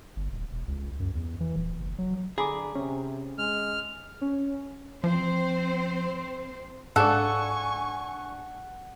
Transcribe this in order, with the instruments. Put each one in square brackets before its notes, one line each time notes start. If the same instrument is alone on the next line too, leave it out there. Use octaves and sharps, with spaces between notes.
[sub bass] G1
D#1
E1
C#2
F#2
E2
E3
D#1
F#1
F#3
[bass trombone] D3 [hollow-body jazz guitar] G#4 [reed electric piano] A#5 B5 D6
[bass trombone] C3 [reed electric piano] C#4
[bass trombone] G#3 [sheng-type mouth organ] F6
[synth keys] C#4
[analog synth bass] F3 [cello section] C4 C5
[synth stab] G#2 D4 [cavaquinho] A4 [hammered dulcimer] F#5 [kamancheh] G#5 C#6